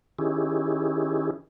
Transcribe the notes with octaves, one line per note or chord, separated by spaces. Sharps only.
D#3 C#4 E4 G4 G#4